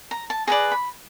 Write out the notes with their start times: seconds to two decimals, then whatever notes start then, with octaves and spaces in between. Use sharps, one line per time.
0.11 A#5
0.30 A5
0.47 G#4 B4 D5 A#5
0.71 B5